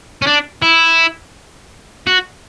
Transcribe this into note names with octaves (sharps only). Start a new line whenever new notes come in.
C#4
D4
E4
F#4